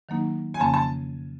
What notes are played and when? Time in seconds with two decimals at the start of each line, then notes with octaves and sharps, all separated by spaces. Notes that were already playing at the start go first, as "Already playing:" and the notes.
0.09 D#3 F#3 A#3 D#4
0.54 G#5
0.60 F2 C#3 F3 A#3 C#4 A5
0.74 A5